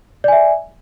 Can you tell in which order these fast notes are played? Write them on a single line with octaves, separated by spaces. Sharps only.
D5 G#5 E5